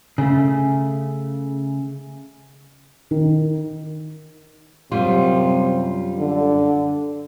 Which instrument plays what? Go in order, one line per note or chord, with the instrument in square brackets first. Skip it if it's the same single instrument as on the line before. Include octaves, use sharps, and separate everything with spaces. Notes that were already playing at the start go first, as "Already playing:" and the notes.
[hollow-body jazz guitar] C#3 A3
[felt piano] D#3
[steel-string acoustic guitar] F#2 G3 F4 [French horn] C3
[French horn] D3